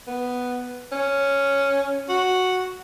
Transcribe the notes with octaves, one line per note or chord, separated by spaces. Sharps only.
B3
C#4
F#4